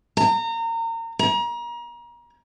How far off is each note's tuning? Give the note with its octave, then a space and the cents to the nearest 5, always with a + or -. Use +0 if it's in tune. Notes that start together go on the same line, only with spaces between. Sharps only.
A#5 -30
A#5 +35